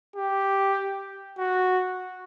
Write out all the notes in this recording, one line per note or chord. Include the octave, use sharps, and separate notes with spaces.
G4
F#4